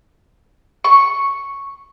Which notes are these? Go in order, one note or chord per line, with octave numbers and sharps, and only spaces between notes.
C#6